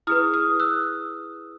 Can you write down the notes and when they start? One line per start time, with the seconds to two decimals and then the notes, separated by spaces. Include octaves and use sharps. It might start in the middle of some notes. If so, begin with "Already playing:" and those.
0.07 E4 G#4 B4 D#6 F6
0.34 D#6 F6
0.59 E6 F#6